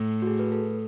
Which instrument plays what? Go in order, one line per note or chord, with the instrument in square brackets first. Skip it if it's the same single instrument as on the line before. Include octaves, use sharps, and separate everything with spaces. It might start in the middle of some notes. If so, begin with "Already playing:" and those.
Already playing: [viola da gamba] A2
[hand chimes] F#4
G#4
B4
A4